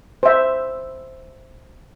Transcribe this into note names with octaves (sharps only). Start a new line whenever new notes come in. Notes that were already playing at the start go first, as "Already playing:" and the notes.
C5 E5